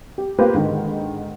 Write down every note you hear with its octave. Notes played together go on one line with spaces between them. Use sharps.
G4
A#3 F4 G4 B4 C5
G#2 D3 D#3